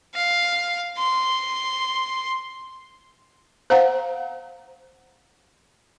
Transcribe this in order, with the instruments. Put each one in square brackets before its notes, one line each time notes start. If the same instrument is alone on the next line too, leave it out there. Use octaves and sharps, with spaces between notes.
[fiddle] F5
C6
[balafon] C5 F5 F#5 A#5